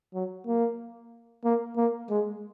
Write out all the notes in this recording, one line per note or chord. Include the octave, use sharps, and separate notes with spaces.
F#3
A#3
A#3
A#3
G#3